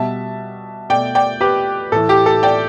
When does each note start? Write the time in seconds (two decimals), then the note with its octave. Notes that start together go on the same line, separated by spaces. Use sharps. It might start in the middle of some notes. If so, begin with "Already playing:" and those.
Already playing: B2 G3 E5 A5
0.90 B2 A3 D5 G5
1.15 D5 G5
1.41 G4 B4
1.92 A2 E3 A3 A4
2.09 G4
2.26 A4
2.43 D5 G5